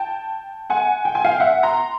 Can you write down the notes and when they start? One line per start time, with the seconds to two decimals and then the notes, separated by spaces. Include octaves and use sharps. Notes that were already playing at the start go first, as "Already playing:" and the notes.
Already playing: G5 A5
0.70 F#5 G#5
1.05 G5
1.15 G#5
1.24 F5 G5
1.40 E5 F#5
1.63 A#5 C6